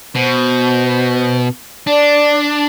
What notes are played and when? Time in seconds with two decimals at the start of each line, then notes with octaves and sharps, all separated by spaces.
0.15 B2 C5
1.87 D4 D5